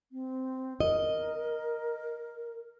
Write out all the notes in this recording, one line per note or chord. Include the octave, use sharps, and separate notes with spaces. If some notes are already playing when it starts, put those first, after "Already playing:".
C4
A#4 D#5